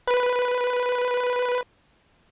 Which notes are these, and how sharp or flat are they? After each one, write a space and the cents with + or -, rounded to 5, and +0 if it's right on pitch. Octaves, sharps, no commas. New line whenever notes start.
B4 +0